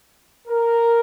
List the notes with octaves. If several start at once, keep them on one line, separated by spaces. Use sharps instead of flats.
A#4